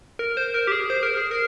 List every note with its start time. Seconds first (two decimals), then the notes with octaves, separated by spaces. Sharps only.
0.19 A#4
0.37 C5
0.54 A#4
0.67 G4
0.72 G#4
0.90 C5
1.03 A#4
1.17 G#4
1.31 A#4